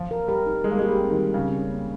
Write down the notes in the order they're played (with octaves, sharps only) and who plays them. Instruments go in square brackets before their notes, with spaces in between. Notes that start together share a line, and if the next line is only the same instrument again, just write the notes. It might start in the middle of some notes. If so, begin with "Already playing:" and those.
Already playing: [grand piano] F3
[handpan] A#4
[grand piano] G3 [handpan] A#4
[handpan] D#4
[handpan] G3 [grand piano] G#3
[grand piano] A#3
G#3
[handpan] G4
[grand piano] G3
[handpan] C4
[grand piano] D#3
[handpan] G3
[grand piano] C#3 [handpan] G3
[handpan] C#4
A#3